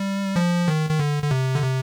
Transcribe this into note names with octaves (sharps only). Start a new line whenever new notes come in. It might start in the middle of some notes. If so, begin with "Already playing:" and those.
Already playing: G3
F3
D#3
D#3
D3
D3
C3
D3
C3